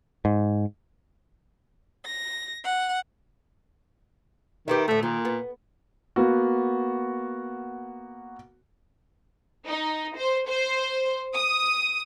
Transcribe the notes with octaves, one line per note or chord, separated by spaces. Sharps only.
G#2
A#6
F#5
D#3 G4 B4 E5
D2 A2 A3
A#2 D#3
B3
A#3 B3 F#4
D#4
C5
C5
D#6